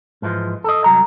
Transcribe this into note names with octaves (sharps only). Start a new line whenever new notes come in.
G#2 E3 F3 G#3
A4 D#5
C2 F#3 A#5